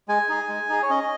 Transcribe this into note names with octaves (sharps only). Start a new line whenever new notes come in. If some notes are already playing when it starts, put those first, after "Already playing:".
G#3 G#5
D#4 G#4
G#3
D#4 G#4
C#5
C#4 D#5